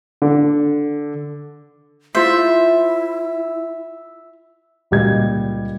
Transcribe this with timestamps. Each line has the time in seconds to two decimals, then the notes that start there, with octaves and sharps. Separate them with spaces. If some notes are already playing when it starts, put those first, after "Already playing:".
0.22 D3
2.15 E4 F4 C5 E5
4.91 C#2 A#2 G3 D#5 G#6